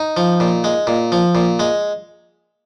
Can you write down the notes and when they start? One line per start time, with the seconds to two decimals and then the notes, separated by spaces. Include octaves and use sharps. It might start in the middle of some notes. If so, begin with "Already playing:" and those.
Already playing: D#4
0.17 F3
0.40 A#2
0.64 G#3
0.87 A#2
1.12 F3
1.35 A#2
1.59 G#3